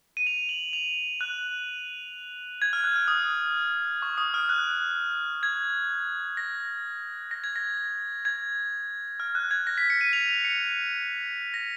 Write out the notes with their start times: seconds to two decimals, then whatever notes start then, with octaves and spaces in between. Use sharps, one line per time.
0.17 D#7
0.27 F7
0.49 F#7
0.73 F7
1.21 F#6
2.62 G#6
2.73 F6
2.84 F#6
2.96 F6
3.08 D#6
4.02 C#6
4.18 D#6
4.34 F6
4.49 F#6
5.43 G#6
6.37 A#6
7.31 A#6
7.44 G#6
7.56 A#6
8.25 G#6
9.20 F6
9.35 F#6
9.51 G#6
9.67 A#6
9.78 B6
9.90 C#7
10.01 D#7
10.13 F7
10.29 F7
10.45 C#7
11.54 A#6